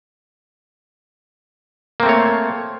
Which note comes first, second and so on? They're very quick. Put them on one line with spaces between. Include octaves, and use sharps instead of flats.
A#3 C4 A3 C#5